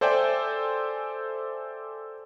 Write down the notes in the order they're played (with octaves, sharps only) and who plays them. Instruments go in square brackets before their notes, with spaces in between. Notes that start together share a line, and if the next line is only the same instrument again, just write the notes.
[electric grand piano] A4 C5 D5 E5 G5 G#5